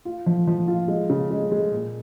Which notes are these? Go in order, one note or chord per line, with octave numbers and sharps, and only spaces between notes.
F4
F3
F3
F4
G#3
C#3
G#3
G#3
A#2